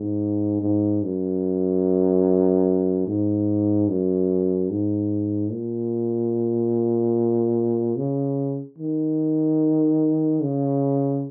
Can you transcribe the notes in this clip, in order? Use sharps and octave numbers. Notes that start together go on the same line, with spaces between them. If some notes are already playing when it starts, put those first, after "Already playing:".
Already playing: G#2
G#2
F#2
G#2
F#2
G#2
A#2
C#3
D#3
C#3